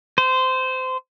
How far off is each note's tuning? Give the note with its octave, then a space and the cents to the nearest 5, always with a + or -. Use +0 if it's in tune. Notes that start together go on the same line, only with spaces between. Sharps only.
C5 -20